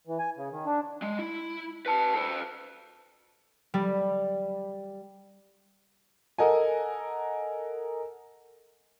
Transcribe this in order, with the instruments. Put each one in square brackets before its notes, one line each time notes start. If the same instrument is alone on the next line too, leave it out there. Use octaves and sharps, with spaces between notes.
[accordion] E3
G#5
C#3
D#3
D4
[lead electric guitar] G#3
E4
B4 A5
A4 C5
[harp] G3
[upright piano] A4 A#4 D#5 F#5 G#5